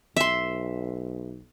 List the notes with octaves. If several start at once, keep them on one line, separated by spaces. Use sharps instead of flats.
B1 E5 C6